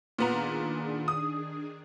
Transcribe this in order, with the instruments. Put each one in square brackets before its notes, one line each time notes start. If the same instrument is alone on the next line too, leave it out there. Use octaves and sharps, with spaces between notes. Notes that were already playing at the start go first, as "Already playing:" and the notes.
[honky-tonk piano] A#2 B3 A#5 [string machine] D#3 D4 G#4
[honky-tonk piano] D#6